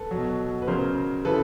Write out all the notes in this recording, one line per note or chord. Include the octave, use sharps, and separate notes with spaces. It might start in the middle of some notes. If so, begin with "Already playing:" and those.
Already playing: A4 B4
B2 F#3
B4
C#3 F#3 A#4 C5
C#3 E3 A4 B4